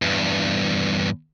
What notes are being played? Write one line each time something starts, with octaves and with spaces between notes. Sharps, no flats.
E2 G2